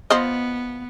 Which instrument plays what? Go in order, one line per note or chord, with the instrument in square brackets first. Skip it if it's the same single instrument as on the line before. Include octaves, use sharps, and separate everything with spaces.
[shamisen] F3 C5 D#5 [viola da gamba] B3